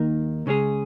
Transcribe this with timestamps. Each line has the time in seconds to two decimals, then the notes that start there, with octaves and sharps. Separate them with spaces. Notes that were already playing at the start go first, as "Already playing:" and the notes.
Already playing: D#2 D#3 A#3 D#4 A#4
0.46 C#2 C#3 G#3 C#4 G#4